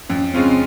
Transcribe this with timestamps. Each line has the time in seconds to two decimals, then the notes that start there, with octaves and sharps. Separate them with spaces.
0.09 F2 C#4
0.34 C#3 G#3 C4 C#4 F4